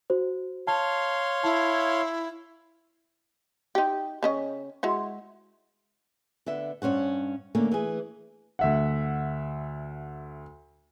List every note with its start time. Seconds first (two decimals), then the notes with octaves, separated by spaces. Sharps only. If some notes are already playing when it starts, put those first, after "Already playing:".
0.10 F#4 C5
0.67 C#5 F5 A5 C6
1.44 E4 A5
3.75 D#4 G4
4.23 C#3 C#4 D#5
4.83 G#3 E4 F#4
6.46 D3 B3 E5
6.82 G2 C#4 C5 F#5
7.55 D3 A3 A#3 C#4
7.71 E3 G#4
8.59 D2 E5 F#5